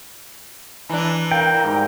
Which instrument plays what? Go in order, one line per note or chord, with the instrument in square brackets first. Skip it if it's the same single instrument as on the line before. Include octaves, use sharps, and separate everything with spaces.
[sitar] E3 D4 [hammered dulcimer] E5 [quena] A#5
[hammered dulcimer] A#4 F5 [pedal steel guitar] G5
[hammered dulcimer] G#2 G3 G#3